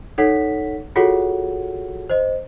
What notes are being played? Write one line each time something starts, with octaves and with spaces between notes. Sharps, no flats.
D#4 A4 C#5 F#5 B6
F4 F#4 G#4 A4 C#5 F#5
C5 D#5